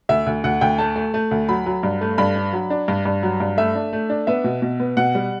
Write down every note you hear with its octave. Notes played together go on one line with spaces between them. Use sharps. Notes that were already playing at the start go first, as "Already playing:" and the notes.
D2 E5
D2
D2 F#5
D2 G5
A3 A5
A3
A3
D2
F#3 B5
F#3
G2
A3
G2 B5
D4
F#3
D4
G2
G2
F#3
G2
A3 E5
D4
A3
D4
B3 E5
B2
B2
B3
B2 F#5
G3